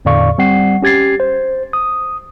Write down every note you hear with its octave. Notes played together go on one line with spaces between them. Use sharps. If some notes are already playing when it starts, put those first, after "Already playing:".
E2 A2 D3 D5 F5 C#6
G3 C4 F#5 C7
C#4 G4 G#6 A6 C7
C5
D#6